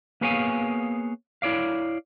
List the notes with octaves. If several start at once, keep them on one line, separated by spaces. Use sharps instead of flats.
A#3 B3 G#4 C#5 F5 G#5
E4 C#5 D5 F5